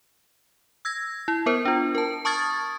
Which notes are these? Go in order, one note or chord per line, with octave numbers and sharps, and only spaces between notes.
E6 G#6 A#6
E4
B3 A#4 C5
D4 F4
A#4 A5
A5 C#6 D#6 F6 G#6 A6